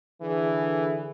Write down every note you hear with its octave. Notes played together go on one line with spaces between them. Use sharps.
D3 E3 G#4